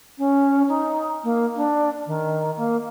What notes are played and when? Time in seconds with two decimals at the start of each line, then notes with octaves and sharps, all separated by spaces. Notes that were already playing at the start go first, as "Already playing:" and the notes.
0.18 C#4
0.69 D#4
1.24 A#3
1.56 D4
2.06 D#3
2.57 A#3